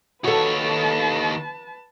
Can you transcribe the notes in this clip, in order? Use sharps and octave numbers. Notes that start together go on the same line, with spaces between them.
D#2 F#4 A4 B4 C#5 A5